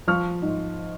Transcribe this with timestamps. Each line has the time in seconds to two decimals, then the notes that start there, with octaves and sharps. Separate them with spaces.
0.07 F3 C#6 F6
0.42 G#2